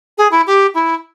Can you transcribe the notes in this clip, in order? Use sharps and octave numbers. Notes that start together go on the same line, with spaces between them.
G#4
E4
G4
E4